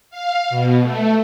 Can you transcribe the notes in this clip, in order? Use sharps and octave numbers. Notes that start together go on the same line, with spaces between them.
F5
B2
A3